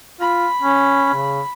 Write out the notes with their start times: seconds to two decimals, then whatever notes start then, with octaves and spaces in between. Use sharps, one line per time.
0.20 F4 B5
0.62 C#4
1.14 C#3